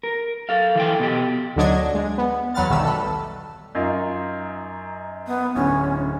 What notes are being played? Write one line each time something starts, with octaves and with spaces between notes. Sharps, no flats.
A#4
A4 F5
E3 A4 G5
B2 G4
D2 D3 F#3 D4 D#5 G#6
G#3
B3
E2 F#3 B4 F#5 F6 A6
B1 D#3 G3 A3 E6
A4 B4
F#2 D#4 F4
B3
D1 D3 C#4